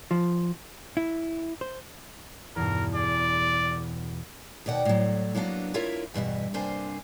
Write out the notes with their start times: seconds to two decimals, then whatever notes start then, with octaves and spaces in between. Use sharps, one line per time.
0.11 F3
0.97 E4
1.61 C5
2.56 E2 G2 B2 A#4
2.95 G#4 D5
4.66 D#2 B2 D5 F#5 G5
4.85 A2 F#3
5.35 F#3 A#3 B3 D4 F#4
5.74 E4 F4 A#4 B4 C#5 E5
6.14 E2 G2 B2 E5
6.54 G2 C3 A#3 D4 C5 G#5